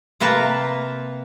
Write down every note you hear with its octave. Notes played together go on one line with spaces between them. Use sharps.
C3 A#3 B4 A5 A#5